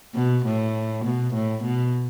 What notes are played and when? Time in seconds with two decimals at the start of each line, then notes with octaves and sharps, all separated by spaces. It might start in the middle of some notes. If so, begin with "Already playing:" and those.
0.15 B2
0.45 A2
1.05 B2
1.33 A2
1.63 B2